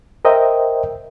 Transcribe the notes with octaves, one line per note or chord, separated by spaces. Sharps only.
A#4 C5 D#5 E5 G5